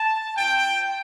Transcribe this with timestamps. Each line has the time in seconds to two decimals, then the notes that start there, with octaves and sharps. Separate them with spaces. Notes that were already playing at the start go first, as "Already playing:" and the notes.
Already playing: A5
0.35 C4 F4 G5